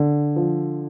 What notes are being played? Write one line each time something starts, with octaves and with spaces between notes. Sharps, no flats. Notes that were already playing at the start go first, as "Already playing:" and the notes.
Already playing: D3
F3